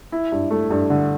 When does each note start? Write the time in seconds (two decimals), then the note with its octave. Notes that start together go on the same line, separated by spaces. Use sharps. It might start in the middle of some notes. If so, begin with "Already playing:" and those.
0.12 E4
0.32 G2
0.51 A3
0.71 G2
0.90 D3